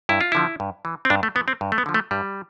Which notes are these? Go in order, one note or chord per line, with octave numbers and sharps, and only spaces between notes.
G2 E4
F4
D3 F3 E4
G2
E3
C4
G2 D4
A3
E3 B3
C4
G2
A3
B3
D3 F3
A3
G2 G3